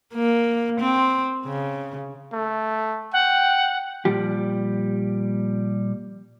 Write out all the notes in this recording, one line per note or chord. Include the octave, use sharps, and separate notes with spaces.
A#3
C4
C#3
A3
F#5 G5
A#2 F3 G3 G4